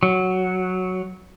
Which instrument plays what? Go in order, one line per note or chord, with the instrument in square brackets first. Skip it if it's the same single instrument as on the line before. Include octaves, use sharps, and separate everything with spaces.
[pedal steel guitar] F#3